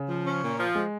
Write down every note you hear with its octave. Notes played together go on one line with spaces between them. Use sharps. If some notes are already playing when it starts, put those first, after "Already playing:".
Already playing: C#3
F3
C#4
A#2
F3
G#3